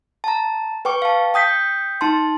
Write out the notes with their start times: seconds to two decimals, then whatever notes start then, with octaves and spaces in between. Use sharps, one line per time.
0.24 A5 A#5
0.85 B4 G5 C#6 D6
1.02 F5 A5
1.34 G5 D#6 G6 B6
2.01 D#4 A5 C6